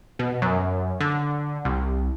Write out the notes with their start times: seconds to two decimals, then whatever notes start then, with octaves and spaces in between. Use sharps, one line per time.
0.19 B2
0.42 F#2
1.00 D3
1.65 C2